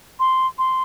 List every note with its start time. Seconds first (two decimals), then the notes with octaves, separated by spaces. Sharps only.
0.20 C6
0.59 C6